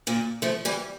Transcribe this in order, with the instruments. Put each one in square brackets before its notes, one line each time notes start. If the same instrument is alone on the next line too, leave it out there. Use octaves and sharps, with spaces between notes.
[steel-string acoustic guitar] A#2 D3
F3 A3
E3 G3